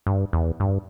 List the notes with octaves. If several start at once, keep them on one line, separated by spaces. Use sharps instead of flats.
G2
E2
G2